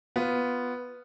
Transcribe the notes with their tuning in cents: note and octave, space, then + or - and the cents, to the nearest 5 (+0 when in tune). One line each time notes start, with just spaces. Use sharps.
B3 +0 F4 +0